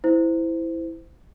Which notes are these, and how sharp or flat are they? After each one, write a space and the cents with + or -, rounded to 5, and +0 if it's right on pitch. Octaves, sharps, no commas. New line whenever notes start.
E4 +0 C5 -20